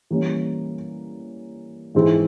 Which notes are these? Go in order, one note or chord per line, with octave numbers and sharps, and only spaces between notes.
E3 G3 A#3 C#4
G#2 E3 G#3 C4 E4